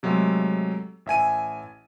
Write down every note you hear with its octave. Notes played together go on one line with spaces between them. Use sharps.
C3 F#3 G#3 A3
A1 E5 G#5 D#7